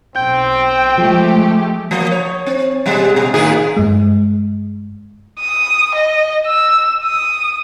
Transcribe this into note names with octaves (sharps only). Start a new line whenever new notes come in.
B1 C4 G5 G6
F3 G#3 A3 G4
F3 A#3
C#5
C4
B2 G3 G#3
B2
A2 D#3 G#4
G2 G#3
D#6
D#5
E6
D#6